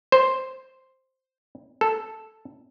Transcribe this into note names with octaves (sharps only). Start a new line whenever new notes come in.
C5
A4